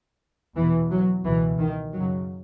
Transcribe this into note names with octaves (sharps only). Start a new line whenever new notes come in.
E2 B2 E3
F#3
C#2 B2 E3
D#3
F#2 C#3 F#3